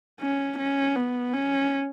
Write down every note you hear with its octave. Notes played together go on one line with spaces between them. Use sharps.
C#4
C#4
B3
C#4